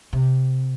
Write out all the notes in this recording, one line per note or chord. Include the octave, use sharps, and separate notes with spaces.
C3